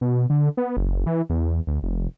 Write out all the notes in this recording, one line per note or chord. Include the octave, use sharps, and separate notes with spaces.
B2
D3
B3
F#1
E3
E2
D2
F1